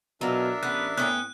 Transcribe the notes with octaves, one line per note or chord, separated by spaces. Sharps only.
B2 F#3 D4 F4 A#4 E5
A1 B3 F#6
A2 B3 C#4 G5 F#6